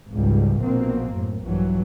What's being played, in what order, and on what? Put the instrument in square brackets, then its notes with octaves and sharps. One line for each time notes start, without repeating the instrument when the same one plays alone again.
[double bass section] G#1 C#2 G#2 G3
A#1 B2 A#3 C4
F#2 A2
A#1 G2 E3 F#3